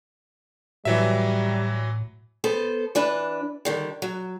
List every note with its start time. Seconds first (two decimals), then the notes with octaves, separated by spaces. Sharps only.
0.85 A2 E3 F#3 G3 E5
2.44 B3 A4 C5
2.95 E3 D4 B4
3.65 D3 D#3 G3
4.02 F#3